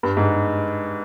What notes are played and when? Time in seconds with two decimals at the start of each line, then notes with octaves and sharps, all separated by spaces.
0.03 G2
0.17 G#2